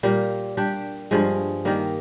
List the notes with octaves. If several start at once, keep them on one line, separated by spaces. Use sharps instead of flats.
A#2 G3 A#3
G3 D4 G4
G2 F3 G#3
D#3 G3 A#3